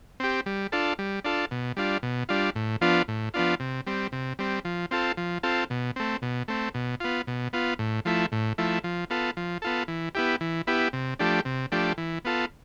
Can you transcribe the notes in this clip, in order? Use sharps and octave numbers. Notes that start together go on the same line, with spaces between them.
C4 G4
G3
D4 F4 A4
G3
D4 F4 A4
B2
G3 D4 F4
B2
G3 D4 F4
A2
F3 B3 D4 F4
A2
F3 B3 D4 F4
C3
G3 C4
C3
G3 C4
F3
C4 F4 A4
F3
C4 F4 A4
B2
A3 C4
B2
A3 C4
B2
B3 F4
B2
B3 F4
A2
F3 A3 E4
A2
F3 A3 E4
F3
B3 F4 A4
F3
B3 F4 A4
E3
B3 E4 G4
E3
B3 E4 G4
C3
F3 A3 D4 G4
C3
F3 A3 D4 G4
E3
B3 F4 A4